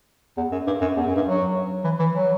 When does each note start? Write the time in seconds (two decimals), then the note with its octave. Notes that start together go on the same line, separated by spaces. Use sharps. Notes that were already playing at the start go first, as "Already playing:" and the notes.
0.37 E2
0.52 F#2
0.67 G2
0.81 F#2
0.97 E2
1.06 F#2
1.16 G2
1.26 F#3
1.85 E3
1.99 E3
2.14 F#3